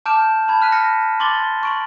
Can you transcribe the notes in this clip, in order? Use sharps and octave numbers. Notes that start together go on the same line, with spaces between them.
A5 D6 F6 G6 D7 E7
A5 B5 G#6
A5 B5 F6 F#6 B6 D#7
F6 A#6 B6 C#7
C6 D6 A6 F#7 G7
C#6 D7 F#7